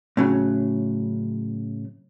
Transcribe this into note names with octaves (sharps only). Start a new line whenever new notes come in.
A2 C#3 F#3